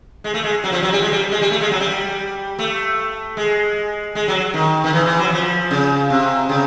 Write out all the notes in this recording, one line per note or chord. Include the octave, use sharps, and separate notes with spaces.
G#3
A3
G#3
F#3
F3
F#3
G3
G#3
G3
G#3
G3
A3
G#3
F#3
G3
A3
G#3
G#3
F#3
D#3
D#3
E3
E3
F#3
F3
C#3
C3
C#3